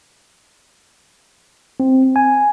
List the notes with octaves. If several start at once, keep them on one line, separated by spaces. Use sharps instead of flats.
C4
G#5